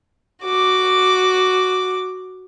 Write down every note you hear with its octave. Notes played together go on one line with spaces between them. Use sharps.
F#4 D6